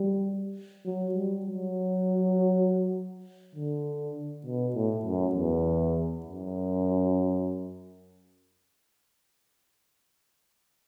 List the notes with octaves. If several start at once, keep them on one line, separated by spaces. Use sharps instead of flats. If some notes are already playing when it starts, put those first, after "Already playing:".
Already playing: G3
F#3
G3
F#3
D3
B2
A2
F#2
E2
F#2